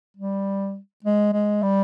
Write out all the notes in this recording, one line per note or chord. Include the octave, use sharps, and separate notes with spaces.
G3
G#3
G#3
G3